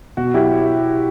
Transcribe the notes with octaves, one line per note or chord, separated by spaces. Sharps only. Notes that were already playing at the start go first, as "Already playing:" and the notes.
B2 F#4
F#3 E4 G4